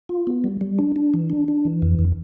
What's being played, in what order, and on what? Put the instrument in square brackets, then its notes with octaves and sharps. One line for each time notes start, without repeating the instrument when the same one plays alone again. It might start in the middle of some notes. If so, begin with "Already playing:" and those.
[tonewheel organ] F4
B3
G3
G3
D4
D4
E3
D4
D4
E3
F2
F2